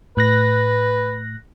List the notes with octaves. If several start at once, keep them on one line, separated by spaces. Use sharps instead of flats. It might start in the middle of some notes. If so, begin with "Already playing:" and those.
A2 B4 F#6 A#6